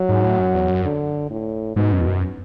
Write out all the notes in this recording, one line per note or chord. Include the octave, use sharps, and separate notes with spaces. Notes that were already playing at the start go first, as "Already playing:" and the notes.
Already playing: F#3
G#2
A2
F#2
E2
F#2
D3
A2
G#2 B2
F#2
E2
F#2